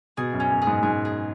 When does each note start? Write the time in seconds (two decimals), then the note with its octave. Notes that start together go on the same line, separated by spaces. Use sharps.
0.17 B2 G#4
0.33 F#2
0.40 C#4
0.50 F#2
0.62 G#4
0.67 G#2
0.83 G#2 G#4
1.05 G#4